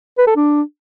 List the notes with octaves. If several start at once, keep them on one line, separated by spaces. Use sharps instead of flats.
B4
A4
D4